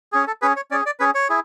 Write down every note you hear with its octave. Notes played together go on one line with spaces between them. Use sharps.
C#4 G#4
A4
C#4 G#4 B4
C#5
C#4 G#4 D5
D5
C#4 G#4 B4
C#5
E4 G#4